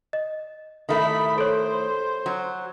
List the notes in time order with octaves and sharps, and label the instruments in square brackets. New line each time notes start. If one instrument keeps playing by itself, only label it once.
[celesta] D#5
[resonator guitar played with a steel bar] D#3 A3 E4 [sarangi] B5
[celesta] A4 C#5 [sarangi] C5
[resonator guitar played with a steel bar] F#3